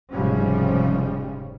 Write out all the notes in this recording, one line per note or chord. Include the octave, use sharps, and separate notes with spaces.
F1 G#2 C#3 F3 G3 C#4